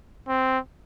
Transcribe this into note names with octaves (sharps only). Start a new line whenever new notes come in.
C4